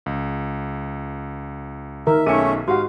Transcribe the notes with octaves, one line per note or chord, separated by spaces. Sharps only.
C#2
D#3 A#4 E5
B1 A3 C#4 D#4 G#4 E5 G5 D#7
G#2 F#4 G4 F5 F#5